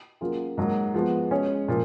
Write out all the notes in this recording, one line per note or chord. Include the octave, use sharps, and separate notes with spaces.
F#3 A#3 C#4 F4 G#4
G#2 F#3 A#3
F3 G#3 B3 F#4
G#3 C#4 G#4 C#5
A#2 F3